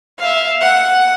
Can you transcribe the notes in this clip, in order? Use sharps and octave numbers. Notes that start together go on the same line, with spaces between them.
E5 F5
F#5